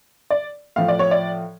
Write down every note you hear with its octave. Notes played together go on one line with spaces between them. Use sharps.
D5
A2 F3 F5
D5
C#5
D5